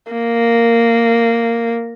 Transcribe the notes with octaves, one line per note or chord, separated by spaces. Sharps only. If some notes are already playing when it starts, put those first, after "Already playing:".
A#3